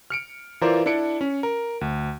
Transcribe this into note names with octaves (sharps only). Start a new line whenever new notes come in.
F6 C#7 D7
E3 E4 F4 A#4 C5 D5
D4 E4 A4 C#7 D7
C#4
A#4
D2